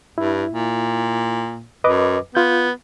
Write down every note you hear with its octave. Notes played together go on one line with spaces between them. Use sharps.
G2 E4
A#2
F#2 B4 D#5 D6
B3 F4 G6